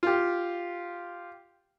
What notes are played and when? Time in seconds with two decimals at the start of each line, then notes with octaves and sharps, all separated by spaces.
0.03 F4 G4